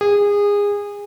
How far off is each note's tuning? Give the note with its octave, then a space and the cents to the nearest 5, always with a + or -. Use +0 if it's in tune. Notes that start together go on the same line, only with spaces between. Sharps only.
G#4 -25